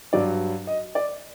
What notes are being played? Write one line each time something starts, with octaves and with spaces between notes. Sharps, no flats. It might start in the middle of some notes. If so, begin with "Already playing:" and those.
G2 F#3 D5
D#5
D5